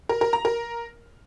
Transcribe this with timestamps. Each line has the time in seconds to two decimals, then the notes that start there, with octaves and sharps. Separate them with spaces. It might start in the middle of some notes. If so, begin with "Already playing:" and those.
0.09 A#4
0.21 A#4
0.33 A#5
0.45 A#4